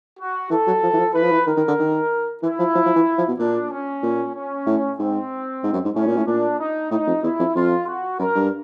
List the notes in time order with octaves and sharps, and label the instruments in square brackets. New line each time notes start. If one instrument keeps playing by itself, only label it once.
[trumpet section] F#4
[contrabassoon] E3 [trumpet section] A4
[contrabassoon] F#3
F3
E3
F3
[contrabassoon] E3 [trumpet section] B4
[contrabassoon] F3
E3
[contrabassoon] D#3 [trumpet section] A#4
[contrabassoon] D#3
D3
D#3
[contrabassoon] E3 [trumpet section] E4
[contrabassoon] F3
F3
F3
E3
F3
B2
[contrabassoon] A#2 [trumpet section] D4
[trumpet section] C#4
[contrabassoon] A#2
[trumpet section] C#4
[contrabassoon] A2
[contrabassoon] G#2 [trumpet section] C4
[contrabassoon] G#2
F#2
G#2
[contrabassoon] A2 [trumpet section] C#4
[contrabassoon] A#2
A2
[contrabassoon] A#2 [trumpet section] D4
[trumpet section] D#4
[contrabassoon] A2 [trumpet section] D#4
[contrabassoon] F2
[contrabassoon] E2 [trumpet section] E4
[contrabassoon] F2
[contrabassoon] F2 [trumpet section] F4
[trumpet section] F#4
[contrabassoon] F#2 [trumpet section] A#4
[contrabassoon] G2